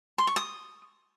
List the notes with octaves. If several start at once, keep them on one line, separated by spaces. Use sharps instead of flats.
C6
C#6
D#6